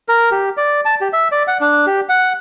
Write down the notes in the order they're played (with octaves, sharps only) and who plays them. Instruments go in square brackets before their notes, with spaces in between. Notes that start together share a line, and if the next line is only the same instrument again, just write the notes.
[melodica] A#4
G4
D5
A5
G4
E5
D5
F#5
D4
G4
F#5